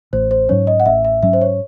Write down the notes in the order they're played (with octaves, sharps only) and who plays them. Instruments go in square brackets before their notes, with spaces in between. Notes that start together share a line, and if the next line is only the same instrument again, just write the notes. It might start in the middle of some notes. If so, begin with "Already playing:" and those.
[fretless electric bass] A1 [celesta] C5
[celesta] C5
[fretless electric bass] G#2 F#3 C#4 [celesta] C#5
[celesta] D#5
F#5
[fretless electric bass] A1 [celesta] E5
[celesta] E5
[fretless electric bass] G#2 F#3 C#4 [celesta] E5
[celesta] C5
C#5